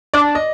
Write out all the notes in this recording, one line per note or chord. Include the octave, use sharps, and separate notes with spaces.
D4 D5
D#5